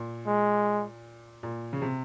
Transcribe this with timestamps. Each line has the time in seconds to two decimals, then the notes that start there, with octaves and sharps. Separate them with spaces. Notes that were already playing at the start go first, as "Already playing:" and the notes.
Already playing: A#2
0.27 G#3
1.43 A#2
1.73 C#3
1.82 C3